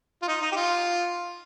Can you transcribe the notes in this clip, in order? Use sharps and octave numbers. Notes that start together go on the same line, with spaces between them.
F4
D#4
D#4
G4
F4